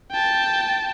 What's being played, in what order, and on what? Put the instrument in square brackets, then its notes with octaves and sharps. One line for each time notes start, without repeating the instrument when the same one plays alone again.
[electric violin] G5 A5